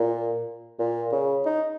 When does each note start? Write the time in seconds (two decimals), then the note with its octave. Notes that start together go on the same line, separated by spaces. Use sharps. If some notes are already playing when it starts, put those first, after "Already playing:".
Already playing: A#2
0.79 A#2
1.12 C#3
1.46 D#4